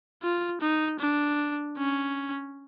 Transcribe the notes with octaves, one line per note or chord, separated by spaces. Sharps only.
F4
D#4
D4
C#4